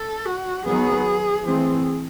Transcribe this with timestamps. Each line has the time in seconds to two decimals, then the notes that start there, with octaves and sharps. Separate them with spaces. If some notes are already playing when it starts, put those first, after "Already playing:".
Already playing: A4
0.25 F#4
0.65 D#3 F#3 B3 G#4
1.46 E3 A3 C4 G#4